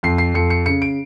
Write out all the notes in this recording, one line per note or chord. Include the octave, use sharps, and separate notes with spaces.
F2 C7
C7
F2 C#7
C#7
C#3 C#7
D7